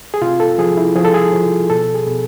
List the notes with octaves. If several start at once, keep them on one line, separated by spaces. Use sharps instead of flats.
G#4
C3 F4
A4
F3 G#4
E4
F3 G#4
A4
G#4
F3
B2 A4
G#4
B2